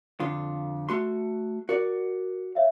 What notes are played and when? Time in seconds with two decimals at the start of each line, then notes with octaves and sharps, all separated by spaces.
0.20 F2 D3 F4 D#6
0.89 A3 F#4 C6
1.69 F#4 A#4 D5
2.55 C#5 E5 F5